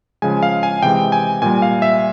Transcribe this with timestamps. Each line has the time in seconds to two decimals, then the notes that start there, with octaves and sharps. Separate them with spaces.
0.22 C#3 F3 G#3 G#5
0.43 F5
0.63 G#5
0.82 C3 E3 G#3 G5
1.12 G#5
1.42 A#2 G3 G#5
1.62 F5
1.82 E5